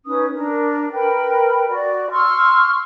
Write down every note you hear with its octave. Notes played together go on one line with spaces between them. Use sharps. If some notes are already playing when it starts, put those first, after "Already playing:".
C#4 D#4 B4 D#6
D4 A#4
A#4 B4 G5 B5
F#4 D5
C6 C#6 E6 F6